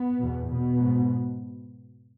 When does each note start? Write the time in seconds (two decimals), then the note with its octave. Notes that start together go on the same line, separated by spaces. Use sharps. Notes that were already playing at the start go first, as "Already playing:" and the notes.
Already playing: B3
0.19 E2 B2
0.49 B2 B3
0.79 G#2